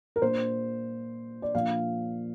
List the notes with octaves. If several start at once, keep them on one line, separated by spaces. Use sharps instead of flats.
A#4
A#2 A#3 D4 C5
D5
A#2 F3 A#3 D4 F5